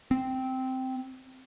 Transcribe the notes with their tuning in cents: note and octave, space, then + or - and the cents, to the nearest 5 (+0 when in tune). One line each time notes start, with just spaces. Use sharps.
C4 -10